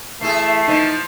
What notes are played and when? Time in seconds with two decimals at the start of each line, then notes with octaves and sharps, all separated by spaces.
0.21 E3 A3 E4 G#4 C7
0.68 E3 F3 D#4